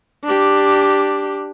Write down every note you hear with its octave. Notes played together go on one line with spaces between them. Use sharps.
D4 G4